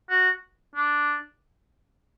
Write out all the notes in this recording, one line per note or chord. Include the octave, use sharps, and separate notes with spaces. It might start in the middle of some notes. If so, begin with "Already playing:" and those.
F#4
D4